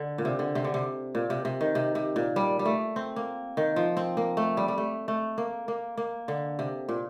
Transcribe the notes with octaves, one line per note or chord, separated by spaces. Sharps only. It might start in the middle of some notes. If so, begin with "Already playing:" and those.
Already playing: D3
A#2
C3
D3
C3
D3
C3
A#2
C3
C3
D#3
C3
C3
A#2
G3
G3
A3
C4
A#3
D#3
F3
C4
A#3
A3
G3
G3
A3
A3
A#3
A#3
A#3
D3
C3
A#2